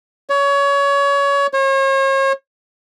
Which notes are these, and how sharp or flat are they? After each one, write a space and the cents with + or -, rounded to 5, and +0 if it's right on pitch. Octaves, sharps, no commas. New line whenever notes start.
C#5 +25
C#5 -40